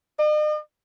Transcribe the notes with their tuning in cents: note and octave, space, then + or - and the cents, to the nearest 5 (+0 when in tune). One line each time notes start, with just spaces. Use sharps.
D#5 -45